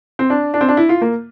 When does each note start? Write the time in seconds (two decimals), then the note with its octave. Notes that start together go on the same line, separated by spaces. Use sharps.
0.19 C4
0.30 D4
0.54 D4
0.61 C4
0.69 D4
0.77 E4
0.89 F4
1.02 A#3